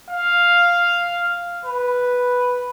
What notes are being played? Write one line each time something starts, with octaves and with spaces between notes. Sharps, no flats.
F5
B4